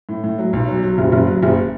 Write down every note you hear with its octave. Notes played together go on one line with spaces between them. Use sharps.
A2
A2
F#3
B1
F#3
F#3
F#1
F#1
F#3
F#1